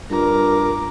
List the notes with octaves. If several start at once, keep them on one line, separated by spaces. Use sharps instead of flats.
G2 F4 A#4 A#5 D6